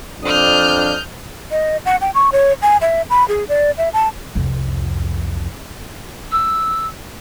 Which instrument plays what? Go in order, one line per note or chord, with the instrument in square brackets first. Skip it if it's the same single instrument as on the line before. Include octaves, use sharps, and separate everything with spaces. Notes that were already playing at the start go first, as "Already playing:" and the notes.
[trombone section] F2 D4 [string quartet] D#6 F6 G6
[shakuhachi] D#5
F#5
G5
C#6
C#5
G#5
E5
B5
G#4
D5
E5
A5
[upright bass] C2 F2
[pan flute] E6